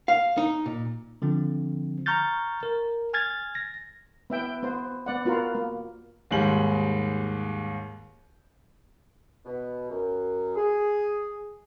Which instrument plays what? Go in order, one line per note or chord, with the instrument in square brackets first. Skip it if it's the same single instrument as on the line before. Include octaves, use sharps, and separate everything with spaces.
[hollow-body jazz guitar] F5
D#4
A#2
[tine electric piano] D3 F3 C4
A#5 C#6 F6 G6 A6
A#4
G#5 F6 G#6 A6
A#6
[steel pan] B3 E5 G5
B3 C5
B3 D5 F#5
B3 F4 F#4 A#4
A#3
[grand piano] D#2 G#2 G3 G#3 F#7
[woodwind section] B2
F#2
G#4